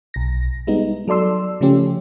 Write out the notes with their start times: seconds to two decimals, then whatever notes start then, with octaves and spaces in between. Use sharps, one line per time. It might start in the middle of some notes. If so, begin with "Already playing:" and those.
0.14 B1 A#6
0.67 G3 G#3 B3 D#4
1.08 F#3 A4 D5 C6 E6
1.61 C#3 F3 A3 C#4 G4